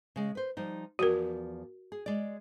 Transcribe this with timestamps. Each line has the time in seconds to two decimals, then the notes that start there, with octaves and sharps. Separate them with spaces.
0.16 C#3 G#3
0.35 B4 C5
0.57 F3 G3 D#4
0.99 E2 F3 F#4 A#4 D5
1.92 G#4
2.06 G#3 D5